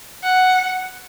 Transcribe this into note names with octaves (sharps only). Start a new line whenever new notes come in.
F#5